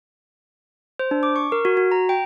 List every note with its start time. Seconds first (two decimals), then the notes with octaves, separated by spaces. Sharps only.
0.99 C5
1.11 D4
1.23 D6
1.36 C#6
1.52 A#4
1.65 F#4
1.77 F#4
1.91 A#5
2.09 G5